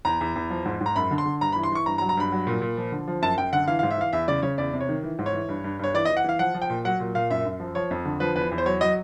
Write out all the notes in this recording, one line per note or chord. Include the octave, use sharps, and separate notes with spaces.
E2 A#5
E2
E2
F3
G#2
G#2
A#5
F#2 B5
D3
C6
D3
G2 A#5
B5
E3
C6
E3 C#6
G2 A#5
A#5
F#3
A#5
G2 B5
F#3
A#2
A#2
F3
D3
F3
F#2 A5
F#2 G5
D3 F#5
E3 F5
F5
G#2
E5
E3 F5
E2 E5
C#3 D5
C#3 C#5
E2 D5
C3
C#5
D#3
E3
G#2
C#5
E3
G2
G2
G2 C#5
E3 D5
D#5
E3
F#5
E3 F5
F3 F#5
F3
G5
A#2
F#3 F#5
A#2
A#2 F5
F#2 E5
F#2
F3
F3 C#5
F2
D3
F3 B4
E2 B4
E2
C5
F#3 C#5
F#3 D#5